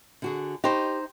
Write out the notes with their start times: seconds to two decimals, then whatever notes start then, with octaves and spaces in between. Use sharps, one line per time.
0.22 D3 F#4 G#4
0.64 D#4 G4 C5